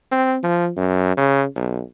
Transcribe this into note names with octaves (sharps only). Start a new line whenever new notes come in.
C4
F3
F#2
C#3
B1